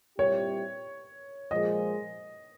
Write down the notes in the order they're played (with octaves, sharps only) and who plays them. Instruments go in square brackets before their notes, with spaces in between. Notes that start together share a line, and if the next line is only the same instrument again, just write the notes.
[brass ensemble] A#2 G3 C4 E4 G4 [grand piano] C#5
[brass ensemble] A#2 F3 G#3 [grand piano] D#5